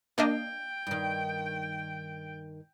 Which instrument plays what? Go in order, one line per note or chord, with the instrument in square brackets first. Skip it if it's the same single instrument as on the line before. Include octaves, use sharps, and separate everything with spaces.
[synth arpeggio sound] A#3 D4 D#5 [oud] F5 [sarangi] G5
[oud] G2 D#3